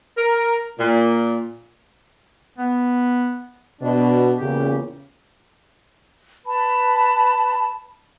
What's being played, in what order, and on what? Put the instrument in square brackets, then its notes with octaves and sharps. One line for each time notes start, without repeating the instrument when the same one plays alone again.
[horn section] A#4
A#2
[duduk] B3
[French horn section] B2 [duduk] D4
[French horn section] E2 A#2 C#3 [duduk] G4
[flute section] B4 A5 B5